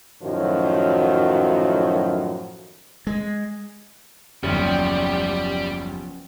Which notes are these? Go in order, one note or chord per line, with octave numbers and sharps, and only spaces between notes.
F#2 A2 D#3 F3 F#3
G#3
F#1 D#2 F3 G3 B3 C#4 G4